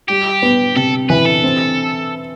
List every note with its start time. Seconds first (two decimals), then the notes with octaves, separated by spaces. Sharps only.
0.08 G3 G4
0.42 B3
0.76 C3 A4
1.10 E3 B4
1.26 A4
1.44 C4